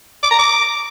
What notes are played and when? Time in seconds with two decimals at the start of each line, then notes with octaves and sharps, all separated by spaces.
0.23 D6
0.31 A#5
0.39 D6